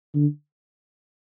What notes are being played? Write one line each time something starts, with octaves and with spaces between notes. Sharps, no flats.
D3